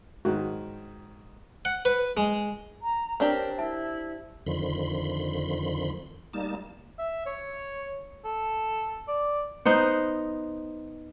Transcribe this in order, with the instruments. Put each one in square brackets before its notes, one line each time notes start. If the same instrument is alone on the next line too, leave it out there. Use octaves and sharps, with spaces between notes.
[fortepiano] G#2 D#3 [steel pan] F#4
[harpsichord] F#5
B4
G#3
[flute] A#5
[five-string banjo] C4 D4 G4 [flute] A#4 [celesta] C#5
[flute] E4 [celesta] E5 A5
[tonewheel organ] F2 D3 D#3 F3 B5 C6
G3 A#3 D#4 A5
[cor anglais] E5
C#5
A4
D5
[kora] B3 D#4 C5 F#5